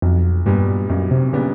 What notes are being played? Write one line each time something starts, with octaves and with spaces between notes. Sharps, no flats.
B1 F2
G2 A#2 G3 B3 D4
B1 F#2
C3
A#2 C#3 G3 B3 D4